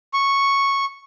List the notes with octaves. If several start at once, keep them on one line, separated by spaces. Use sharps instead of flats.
C#6